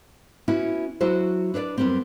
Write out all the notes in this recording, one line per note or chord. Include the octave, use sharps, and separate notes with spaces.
B3 C#4 E4 F#4
F#3 E4 F#4 C5
D4 B4 C5 D5
F#2 C#3 G3 B3 C4